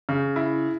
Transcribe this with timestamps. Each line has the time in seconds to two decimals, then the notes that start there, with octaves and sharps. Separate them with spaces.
0.09 C#3
0.36 E4